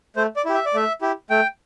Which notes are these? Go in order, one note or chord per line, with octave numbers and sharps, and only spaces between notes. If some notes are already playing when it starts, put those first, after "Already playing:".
A3 C5
D5
E4 G4
E5
D5
A3 E5
E4 G4
A3 G5